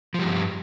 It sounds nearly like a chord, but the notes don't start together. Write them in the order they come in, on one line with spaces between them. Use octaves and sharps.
F3 G3 G2